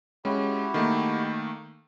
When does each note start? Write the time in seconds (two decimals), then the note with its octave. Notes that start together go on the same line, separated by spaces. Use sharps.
0.25 G#3 C#4 E4 F#4 G4
0.74 D#3 A3 A#3